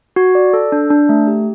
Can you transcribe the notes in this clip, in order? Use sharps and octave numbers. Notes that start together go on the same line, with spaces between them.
F#4
D5
A4
D4
D4
A3
G4